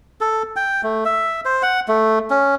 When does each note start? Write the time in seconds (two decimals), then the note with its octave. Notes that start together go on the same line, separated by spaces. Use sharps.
0.21 A4
0.56 G5
0.83 A3
1.05 E5
1.45 C5
1.63 F#5
1.88 A3
2.30 C#4